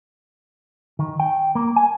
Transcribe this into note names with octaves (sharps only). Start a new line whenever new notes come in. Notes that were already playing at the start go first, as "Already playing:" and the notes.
D#3
G5
A#3
G#5